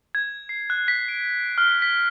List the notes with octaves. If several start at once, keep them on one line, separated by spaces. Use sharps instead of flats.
G#6
C7
F#6
B6
D7
F6
B6